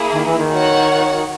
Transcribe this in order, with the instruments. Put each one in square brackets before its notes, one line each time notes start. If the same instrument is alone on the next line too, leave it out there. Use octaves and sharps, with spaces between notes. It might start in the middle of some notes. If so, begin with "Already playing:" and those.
Already playing: [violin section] A#3 E4 G#4
[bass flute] D#3
E3
D#3
[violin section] F#4 C#5 F#5